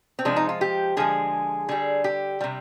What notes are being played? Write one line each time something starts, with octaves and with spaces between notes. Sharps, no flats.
C4
C3 F3 G#3 D4
D#4
F4
G4
D3 F3 G#3 G#4
D3 G3 G#4
G4
C3 G3